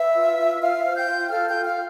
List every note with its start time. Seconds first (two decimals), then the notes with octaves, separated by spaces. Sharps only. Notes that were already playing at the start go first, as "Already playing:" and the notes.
Already playing: B4 E5 E6
0.15 F4
0.38 F4
0.61 F4 F5 F6
0.84 C5
0.96 G5 G6
1.07 F4
1.30 A4 F5 F6
1.47 G5 G6
1.53 F4
1.64 F5 F6